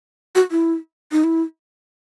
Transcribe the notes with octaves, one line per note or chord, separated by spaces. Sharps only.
F#4
E4
D#4
E4